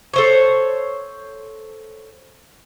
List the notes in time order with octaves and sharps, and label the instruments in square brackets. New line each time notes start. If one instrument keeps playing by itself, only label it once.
[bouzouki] A4 C5 C#5